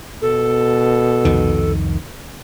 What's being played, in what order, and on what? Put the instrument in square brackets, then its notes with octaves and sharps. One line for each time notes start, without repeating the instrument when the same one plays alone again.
[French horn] B2 [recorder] A4
[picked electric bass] C2 F2 D#3